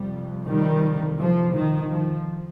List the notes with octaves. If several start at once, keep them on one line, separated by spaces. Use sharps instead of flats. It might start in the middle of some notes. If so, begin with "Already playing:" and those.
Already playing: F2 C3 G3
D#3 G3
F3
D#3
F3